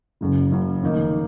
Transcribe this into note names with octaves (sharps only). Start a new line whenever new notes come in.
F#1 F#2 C#3
F#1 F#2 C#3
F1 D#2 D#3 A#3 D#4